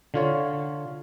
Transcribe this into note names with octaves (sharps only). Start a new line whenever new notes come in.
D3 F4 C#5